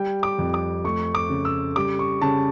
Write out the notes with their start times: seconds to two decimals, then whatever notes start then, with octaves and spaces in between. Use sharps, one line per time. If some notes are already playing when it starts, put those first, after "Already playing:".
Already playing: G3 G5
0.23 D6
0.39 F2
0.54 D6
0.84 A3 C#6
1.15 D6
1.29 C#3
1.45 E6
1.76 G3 D6
1.99 C#6
2.22 C#3 A5